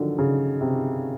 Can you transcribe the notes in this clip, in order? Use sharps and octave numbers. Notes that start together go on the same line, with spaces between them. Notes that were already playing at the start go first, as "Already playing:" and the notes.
Already playing: D3 D#3 F3 F#3
C#3
C3